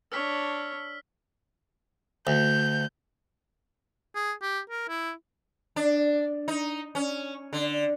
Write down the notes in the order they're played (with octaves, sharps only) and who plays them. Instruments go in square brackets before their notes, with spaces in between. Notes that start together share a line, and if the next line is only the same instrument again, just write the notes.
[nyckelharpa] D4 C#5 [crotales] E6 F6 B6
[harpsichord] D2 [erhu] G6
[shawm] G#4
G4
A#4
E4
[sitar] D4
D#4
C#4
D3